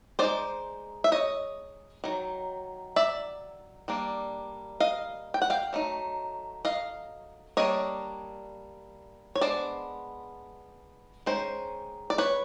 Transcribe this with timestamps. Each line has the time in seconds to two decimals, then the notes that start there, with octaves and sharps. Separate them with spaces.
0.19 G#3 C4 D#4 C5 D5
1.04 E5
1.12 C#5 D#5
2.04 D#3 F#3
2.96 D5 E5
3.88 G3 A#3 D4
4.80 D#5 F5
5.34 G5
5.42 F#5
5.50 F5 G5
5.73 F#3 A3 D#4
6.65 D#5 F5
7.57 G3 A#3 D4 C#5 D#5
9.35 C#5
9.41 G#3 B3 D4 C5 D5
11.26 D#3 G#3 C#4 C5
12.10 D5
12.18 B4 C#5